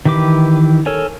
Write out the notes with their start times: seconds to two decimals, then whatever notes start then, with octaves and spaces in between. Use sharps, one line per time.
0.05 D#3 E3 G4 B4 D6
0.86 A4 A#4 C#5 G#5